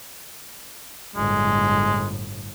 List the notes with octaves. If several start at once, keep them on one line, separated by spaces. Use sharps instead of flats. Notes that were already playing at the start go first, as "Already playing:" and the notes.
G1 A2 G#3